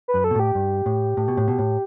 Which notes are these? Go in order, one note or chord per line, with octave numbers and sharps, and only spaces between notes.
B4
F#2
A4
B2
A2 G4
G2
A2
A2
B2
A2
B2
A2